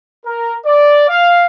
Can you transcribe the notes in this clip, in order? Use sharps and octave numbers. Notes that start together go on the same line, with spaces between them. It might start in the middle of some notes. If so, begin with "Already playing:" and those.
A#4
D5
F5